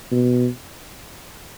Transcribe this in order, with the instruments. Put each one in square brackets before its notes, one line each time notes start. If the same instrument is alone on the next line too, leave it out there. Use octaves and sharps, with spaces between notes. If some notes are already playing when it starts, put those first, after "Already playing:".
[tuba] B2